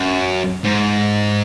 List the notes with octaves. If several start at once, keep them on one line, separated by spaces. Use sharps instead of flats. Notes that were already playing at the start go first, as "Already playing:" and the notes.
Already playing: F#2
G#2